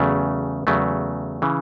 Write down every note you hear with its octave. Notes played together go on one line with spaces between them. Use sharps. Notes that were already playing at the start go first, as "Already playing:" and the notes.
Already playing: E2 C#3 F#3 A3
E2 C#3 F#3 A3
C#3 E3